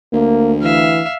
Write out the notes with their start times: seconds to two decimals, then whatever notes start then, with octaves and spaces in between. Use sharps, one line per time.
0.13 D2 A#3
0.62 E3 E5 F5